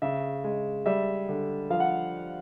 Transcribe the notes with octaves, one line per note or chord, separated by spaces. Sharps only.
C#3 E5
G#3
G3 E5
D3
F3 F5
F#5